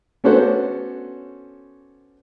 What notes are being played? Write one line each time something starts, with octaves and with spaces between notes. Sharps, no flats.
B3 C#4 D4 F#4 A4 C5